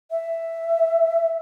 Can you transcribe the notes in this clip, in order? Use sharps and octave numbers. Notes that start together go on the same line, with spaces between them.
E5